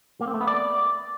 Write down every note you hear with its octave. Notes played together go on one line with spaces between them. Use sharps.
A#3
C4
A3
B3
D5